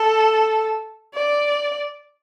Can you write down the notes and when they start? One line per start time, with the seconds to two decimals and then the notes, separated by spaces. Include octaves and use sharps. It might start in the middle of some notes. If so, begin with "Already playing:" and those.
Already playing: A4
1.14 D5